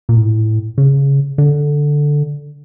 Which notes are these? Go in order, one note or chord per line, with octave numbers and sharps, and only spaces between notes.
A#2
A2
C#3
D3